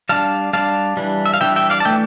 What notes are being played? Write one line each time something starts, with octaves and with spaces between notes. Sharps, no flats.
G3 D4 F5 A5
G3 D4 F5 A5
E3 G3 D4
E5
F5
E3 G3 D4 E5 G5
E5 G5
D5 F5
A5
E3 A3 D4 E5 G5